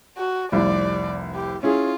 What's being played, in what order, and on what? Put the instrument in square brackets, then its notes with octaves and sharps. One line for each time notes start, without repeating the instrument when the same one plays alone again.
[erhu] F#4
[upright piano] F1 C2 [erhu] D5
[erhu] G4
[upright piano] C#4 E4 G#4 [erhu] F4